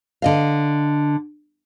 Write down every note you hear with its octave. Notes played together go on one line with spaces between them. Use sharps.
D3 D#5 F5